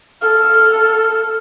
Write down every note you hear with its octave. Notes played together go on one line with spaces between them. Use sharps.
A4 F6